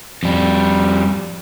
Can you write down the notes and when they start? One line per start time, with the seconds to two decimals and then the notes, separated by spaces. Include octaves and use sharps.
0.23 F2 G3